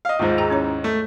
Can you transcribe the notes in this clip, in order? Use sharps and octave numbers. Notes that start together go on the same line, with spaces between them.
D#5 F5
D#2 G#2 F4 C5
G#4 G5 A#5
C#4 E4 C#5
A3